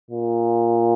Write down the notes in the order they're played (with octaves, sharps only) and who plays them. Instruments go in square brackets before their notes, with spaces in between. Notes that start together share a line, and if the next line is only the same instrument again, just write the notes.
[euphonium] A#2